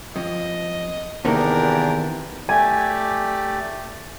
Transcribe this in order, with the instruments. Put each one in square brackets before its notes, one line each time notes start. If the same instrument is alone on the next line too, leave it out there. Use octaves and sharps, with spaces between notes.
[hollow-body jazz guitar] F2 [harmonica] D#5
[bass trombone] E2 [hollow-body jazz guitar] C3 D#3 A#3 [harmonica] D4 G4 A#4
[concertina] A3 G4 D5 [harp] G#5